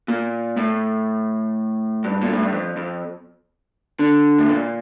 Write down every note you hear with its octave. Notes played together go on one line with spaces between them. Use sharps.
A#2
A2
G2
A#2
A2
G2
F2
F2
D3
A2
A#2